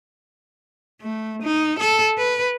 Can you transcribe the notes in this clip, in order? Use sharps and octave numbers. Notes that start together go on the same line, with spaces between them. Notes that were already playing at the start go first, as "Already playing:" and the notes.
A3
D#4
A4
B4